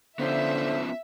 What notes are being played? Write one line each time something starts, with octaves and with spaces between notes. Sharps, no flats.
D3 B3 C#4 F4 C5 E5